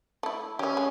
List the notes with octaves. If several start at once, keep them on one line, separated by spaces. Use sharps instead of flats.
A3 E4
C#4 G4 E5
G#3